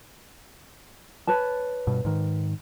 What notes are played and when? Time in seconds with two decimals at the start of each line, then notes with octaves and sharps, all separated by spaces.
1.27 B4 C#5 A5
1.87 G2 B2
2.05 G#2 D#3